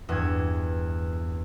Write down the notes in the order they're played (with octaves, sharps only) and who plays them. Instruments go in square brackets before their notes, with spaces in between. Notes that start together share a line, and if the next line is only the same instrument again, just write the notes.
[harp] E2 G2 G#6